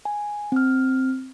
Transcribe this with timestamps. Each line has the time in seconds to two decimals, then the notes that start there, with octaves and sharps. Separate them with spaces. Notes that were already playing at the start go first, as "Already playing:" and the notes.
0.05 G#5
0.52 C4 F6